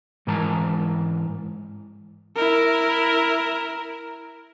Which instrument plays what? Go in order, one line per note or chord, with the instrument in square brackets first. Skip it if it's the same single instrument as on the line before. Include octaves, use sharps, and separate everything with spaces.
[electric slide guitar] G#2 E3 G#3 A#4 A5 A#5
[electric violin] E4 A#4